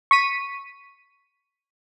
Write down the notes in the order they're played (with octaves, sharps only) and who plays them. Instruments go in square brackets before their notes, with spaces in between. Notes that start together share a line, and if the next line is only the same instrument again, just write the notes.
[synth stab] C#6 B6 D#7